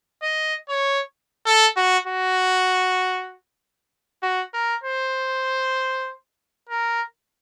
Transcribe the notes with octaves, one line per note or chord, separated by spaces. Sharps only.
D#5
C#5
A4
F#4
F#4
F#4
A#4
C5
A#4